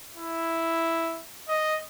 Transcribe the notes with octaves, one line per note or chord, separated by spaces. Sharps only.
E4
D#5